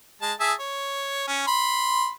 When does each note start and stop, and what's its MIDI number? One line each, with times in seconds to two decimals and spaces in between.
0.22 0.33 56
0.22 0.33 81
0.40 0.53 68
0.40 0.53 76
0.40 0.53 81
0.60 1.26 73
1.27 1.43 61
1.47 2.10 83
1.47 2.10 84